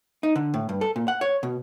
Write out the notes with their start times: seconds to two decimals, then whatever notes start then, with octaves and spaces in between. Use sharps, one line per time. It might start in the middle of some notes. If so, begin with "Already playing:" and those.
0.23 D#4
0.36 D3
0.54 A2
0.69 G2
0.81 A4
0.96 A#2
1.08 F#5
1.21 C#5
1.43 B2